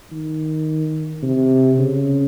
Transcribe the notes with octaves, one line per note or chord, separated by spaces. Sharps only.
D#3
C3
C#3